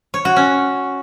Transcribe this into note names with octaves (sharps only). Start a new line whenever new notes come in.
C#5
F#4
C#4